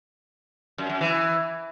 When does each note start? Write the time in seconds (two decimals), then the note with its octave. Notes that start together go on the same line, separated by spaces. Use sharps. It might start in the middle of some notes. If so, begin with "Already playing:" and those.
0.78 F#2
0.90 F#2
1.01 E3